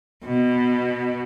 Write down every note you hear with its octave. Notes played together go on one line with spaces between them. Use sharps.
B2